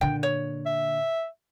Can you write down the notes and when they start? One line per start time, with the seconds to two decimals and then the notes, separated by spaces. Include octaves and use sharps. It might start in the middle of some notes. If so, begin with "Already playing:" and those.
0.01 A#2 D3 G5
0.23 C#5
0.66 E5